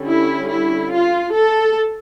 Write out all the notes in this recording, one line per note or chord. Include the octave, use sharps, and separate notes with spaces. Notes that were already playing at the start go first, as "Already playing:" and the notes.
Already playing: D3 G3 C#4
E4
E4
F4
A4